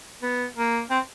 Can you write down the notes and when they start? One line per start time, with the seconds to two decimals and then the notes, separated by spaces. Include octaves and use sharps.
0.22 B3
0.57 A#3
0.90 C4